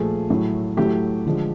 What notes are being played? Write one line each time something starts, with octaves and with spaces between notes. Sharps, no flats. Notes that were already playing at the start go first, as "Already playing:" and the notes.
Already playing: A#2 F3 A3 G#4
A2 F#3 A3
A2 F#3 A3 G4
D3 F3 G#3